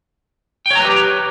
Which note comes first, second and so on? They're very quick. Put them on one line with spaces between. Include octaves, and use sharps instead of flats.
G5 C#5 A#5 B4 G4